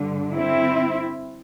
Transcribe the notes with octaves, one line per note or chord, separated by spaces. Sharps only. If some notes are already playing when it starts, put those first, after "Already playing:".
Already playing: G2 D3
C4 E4